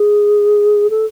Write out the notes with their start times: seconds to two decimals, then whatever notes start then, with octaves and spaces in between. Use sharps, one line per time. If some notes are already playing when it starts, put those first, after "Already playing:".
Already playing: G#4
0.90 A4